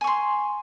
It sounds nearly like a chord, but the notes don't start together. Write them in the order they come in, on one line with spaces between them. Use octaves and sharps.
G#5 C#6 C6